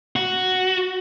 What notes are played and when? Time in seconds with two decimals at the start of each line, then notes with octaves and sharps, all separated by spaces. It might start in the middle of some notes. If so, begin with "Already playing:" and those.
0.16 F#4